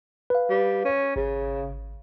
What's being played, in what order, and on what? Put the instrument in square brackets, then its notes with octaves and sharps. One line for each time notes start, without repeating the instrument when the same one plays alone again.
[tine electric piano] B4 F5
[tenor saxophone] G3
C#4
[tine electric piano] G#1 [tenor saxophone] C#3